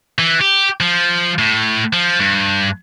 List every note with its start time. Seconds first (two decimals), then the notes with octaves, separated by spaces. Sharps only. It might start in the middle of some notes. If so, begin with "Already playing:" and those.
0.19 E3
0.41 G4
0.81 F3
1.38 A2
1.93 F3
2.19 G2